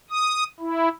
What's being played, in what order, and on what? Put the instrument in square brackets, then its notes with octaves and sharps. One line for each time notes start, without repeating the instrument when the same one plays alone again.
[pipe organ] D#6
E4